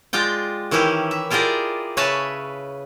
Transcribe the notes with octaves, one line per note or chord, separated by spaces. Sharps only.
G#3 F4 D5 G5
D#3 E3 C#4 E4 G4
E5
E4 F4 G4 G#4 A#4 D5
C#3 B4 C#5 E5 G#5 A5